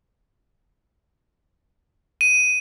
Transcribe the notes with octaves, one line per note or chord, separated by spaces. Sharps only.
D#7